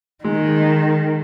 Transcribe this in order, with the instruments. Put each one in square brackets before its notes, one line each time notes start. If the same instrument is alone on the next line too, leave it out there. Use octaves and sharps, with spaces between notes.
[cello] D#3 [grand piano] G#3